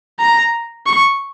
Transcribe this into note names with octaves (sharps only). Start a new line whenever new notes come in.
A#5
C#6